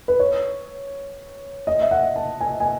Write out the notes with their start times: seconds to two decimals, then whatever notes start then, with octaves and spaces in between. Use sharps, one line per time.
0.08 B4
0.20 C#5
1.67 D#5
1.81 E5
1.91 F#5
2.16 A5
2.41 G#5
2.60 G#5